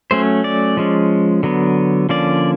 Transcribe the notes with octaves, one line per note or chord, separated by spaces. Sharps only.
F#3 A3 C#4 C5
D5
F3 G#3 C#4
D3 F#3 B3
D3 F3 A#3 C#4 D5